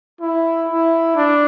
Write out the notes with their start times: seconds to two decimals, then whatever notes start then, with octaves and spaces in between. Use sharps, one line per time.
0.21 E4
0.69 E4
1.16 D4